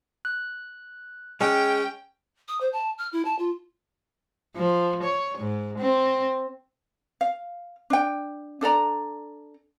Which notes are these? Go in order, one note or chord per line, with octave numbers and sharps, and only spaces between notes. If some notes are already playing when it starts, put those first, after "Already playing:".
F#6
G#3 C#4 G5
D#6
C5
A5
F6
E4
A5
F4
F3
C#5
G#2
C4
F5
D4 G5
D4 A4 D5 A#5